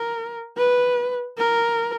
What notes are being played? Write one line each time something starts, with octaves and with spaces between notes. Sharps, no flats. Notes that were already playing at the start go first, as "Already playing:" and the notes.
Already playing: A#4
B4
A#4